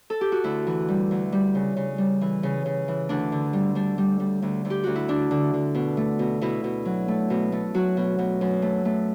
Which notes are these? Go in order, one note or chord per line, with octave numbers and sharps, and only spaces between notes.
A4
G4
F#4
D2 E4
E3
G3
D2
G3
C#3
C#3
G3
E3
C#3
C#3
E3
D2 D4
D3
G3
G3 D4
G3
G3
D2
D2
G4
D2 F#4
E4
D3 D4
D3
D3
B2
A3
B2
B2 E4
B2
F#3
A3
B2
A3
F#3 F#4
B2
B2
F#2
A3
A3